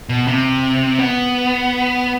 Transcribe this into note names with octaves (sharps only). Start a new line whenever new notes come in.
B2
C3
B3